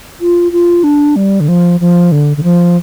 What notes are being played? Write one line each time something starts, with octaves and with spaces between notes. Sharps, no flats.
F4
F4
D4
G3
D3
F3
F3
D3
D3
F3